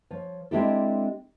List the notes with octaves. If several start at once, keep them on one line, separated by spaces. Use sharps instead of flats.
F3 C#5
G#3 C4 D4 E4 G4 A4